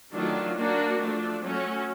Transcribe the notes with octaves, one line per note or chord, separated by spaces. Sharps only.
D#3 F#3 A3 D4 F4
A#3 D4 F#4
F3 A3 D4
F#3 A3 C#4 F#4